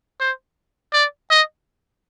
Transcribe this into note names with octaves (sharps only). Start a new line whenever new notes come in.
C5
D5
D#5